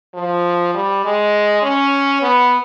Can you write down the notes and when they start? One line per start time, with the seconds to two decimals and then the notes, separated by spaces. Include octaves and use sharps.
0.15 F3
0.74 G3
1.04 G#3
1.63 C#4
2.22 B3